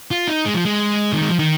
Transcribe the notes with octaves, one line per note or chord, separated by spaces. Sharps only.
F4
D#4
G#3
F3
G#3
D#3
G#3
F3
D#3